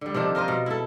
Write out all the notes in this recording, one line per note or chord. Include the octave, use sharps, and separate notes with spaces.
D3 G3
C3 D#3 F3 D4
F4 A#4 C5 D#5
B2
E4 A4